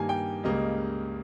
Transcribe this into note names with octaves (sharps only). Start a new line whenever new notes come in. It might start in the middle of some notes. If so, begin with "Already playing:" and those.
Already playing: G2 D#3 G3 A#3 G#5
G5
C#2 C#3 G3 A#3 D#5